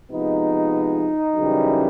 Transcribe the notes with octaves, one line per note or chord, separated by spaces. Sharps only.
C3 F3 G#3 B3 D#4
F#2 C#3 E3 G3